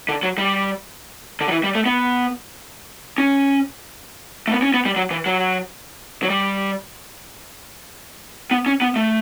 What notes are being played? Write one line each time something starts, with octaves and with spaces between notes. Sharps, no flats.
D3
F#3
G3
D3
F#3
E3
G3
A3
B3
C#4
A3
B3
C#4
B3
G3
F#3
E3
F#3
F#3
G3
B3
C#4
B3
A3